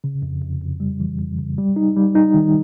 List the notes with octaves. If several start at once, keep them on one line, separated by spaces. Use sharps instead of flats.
C#3
F2
F2
F2
G3
E3
F2
C#3
G3
D#4
G3
D#4
D#3